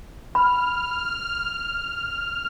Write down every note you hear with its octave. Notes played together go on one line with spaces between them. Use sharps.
B5 F6